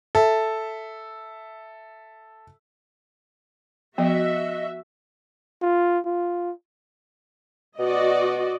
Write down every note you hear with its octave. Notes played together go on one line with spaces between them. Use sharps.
A4 E5
F3 B3 F#4 D#5 E5
F4
F4
B2 F#4 D5 D#5